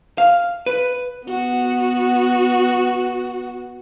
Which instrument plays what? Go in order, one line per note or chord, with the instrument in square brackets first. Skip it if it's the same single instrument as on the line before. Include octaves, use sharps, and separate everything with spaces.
[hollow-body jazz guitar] F5
B4
[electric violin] B3 F#4